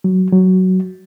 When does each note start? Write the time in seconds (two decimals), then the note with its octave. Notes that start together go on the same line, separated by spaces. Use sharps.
0.04 F#3
0.32 F#3